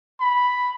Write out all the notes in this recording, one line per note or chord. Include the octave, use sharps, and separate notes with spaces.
B5